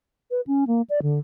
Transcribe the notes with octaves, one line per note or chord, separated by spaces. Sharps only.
B4
C#4
A#3
D5
D3